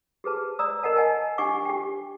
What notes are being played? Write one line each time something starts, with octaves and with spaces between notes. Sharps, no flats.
G4 G#4 B4 A5
D5 A#5 D#6 E6
A#4 D#5 F#5 A5
D#5 F#5 G#5 A5
D4 G4 F#5 G#5 C#6 D6
G4 G5